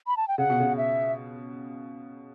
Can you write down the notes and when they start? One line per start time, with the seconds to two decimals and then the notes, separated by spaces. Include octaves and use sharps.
0.07 B5
0.17 A5
0.28 G5
0.38 C#3 F#5
0.49 B2
0.60 C#3
0.77 E5